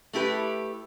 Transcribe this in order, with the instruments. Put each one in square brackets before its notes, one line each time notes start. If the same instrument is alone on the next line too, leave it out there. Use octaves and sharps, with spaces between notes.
[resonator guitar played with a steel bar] A3 E4 G4 B4